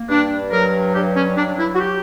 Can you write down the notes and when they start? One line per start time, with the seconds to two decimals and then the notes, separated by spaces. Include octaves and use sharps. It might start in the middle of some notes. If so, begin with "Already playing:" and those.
Already playing: A#3
0.10 G2 D4
0.52 F#3 A#4
0.95 G2 G4
1.16 C#4
1.37 F#3 D4
1.59 E4
1.74 F#4
1.80 G4